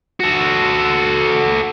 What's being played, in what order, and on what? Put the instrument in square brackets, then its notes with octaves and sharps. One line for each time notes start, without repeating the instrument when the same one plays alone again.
[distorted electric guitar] F#4 A4